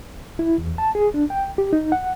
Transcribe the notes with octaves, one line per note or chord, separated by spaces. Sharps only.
E4
E2
A5
G#4
D4
G5
G4
D#4
F#5